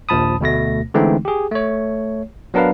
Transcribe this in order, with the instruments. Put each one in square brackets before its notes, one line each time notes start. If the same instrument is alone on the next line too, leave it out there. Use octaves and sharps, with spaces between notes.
[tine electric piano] A#1 D#2 F3 A5 B5 D#6
D2 B2 A3 A#6
D3 E3 G#3 A3 C4 D#4
G4 G#4
A3 C#5
F#3 B3 D4 A#4 B4 F5